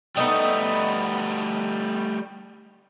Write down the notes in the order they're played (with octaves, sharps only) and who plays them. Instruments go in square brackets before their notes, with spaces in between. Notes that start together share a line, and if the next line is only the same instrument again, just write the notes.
[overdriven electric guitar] G3 A3 [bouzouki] B3 D#4